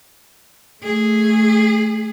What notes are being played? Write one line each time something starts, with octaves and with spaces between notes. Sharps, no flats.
A3 G#4